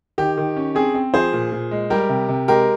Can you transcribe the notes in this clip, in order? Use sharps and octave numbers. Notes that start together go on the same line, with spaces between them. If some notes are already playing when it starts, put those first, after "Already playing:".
D#3 G4
D#3
C#4
C4 G#4
C4
F3 G#4 C5
A#2
A#2
G#3
G3 G4 A#4
C3
C3
G#3 G4 A#4